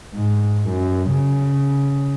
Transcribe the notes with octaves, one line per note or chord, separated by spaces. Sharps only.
G#2
F#2
C#3